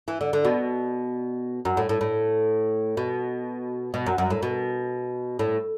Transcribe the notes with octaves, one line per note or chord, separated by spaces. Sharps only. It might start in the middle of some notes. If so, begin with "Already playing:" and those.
E3
D3
D3
B2
F#2
A2
A2
A2
B2
B2
F#2
F#2
A2
B2
A2